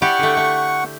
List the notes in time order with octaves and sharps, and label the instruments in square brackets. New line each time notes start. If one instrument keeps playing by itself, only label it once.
[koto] E4 G4 D5 [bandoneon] F#5 C#6
[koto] D3 A3
A3